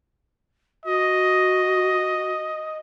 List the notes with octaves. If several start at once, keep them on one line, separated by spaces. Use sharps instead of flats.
F#4 D#5